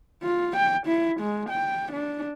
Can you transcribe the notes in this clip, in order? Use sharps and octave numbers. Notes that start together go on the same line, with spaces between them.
F4
G5
E4
G#3
G5
D4